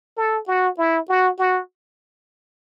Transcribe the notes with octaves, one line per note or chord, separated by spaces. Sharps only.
A4
F#4
E4
F#4
F#4